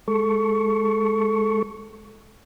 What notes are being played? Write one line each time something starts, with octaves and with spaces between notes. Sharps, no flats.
G#3 A4 C#6